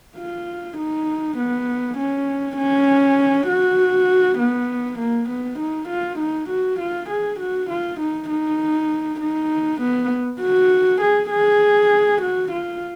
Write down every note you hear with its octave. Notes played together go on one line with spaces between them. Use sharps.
F4
D#4
B3
C#4
C#4
F#4
B3
A#3
B3
D#4
F4
D#4
F#4
F4
G#4
F#4
F4
D#4
D#4
D#4
B3
F#4
G#4
G#4
F#4
F4